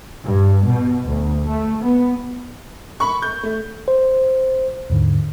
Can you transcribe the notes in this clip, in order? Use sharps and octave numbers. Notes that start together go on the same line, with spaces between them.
G2
B2
D2
A3
B3
B5 C#6
G6
A3
C5
D#2 G#2 D3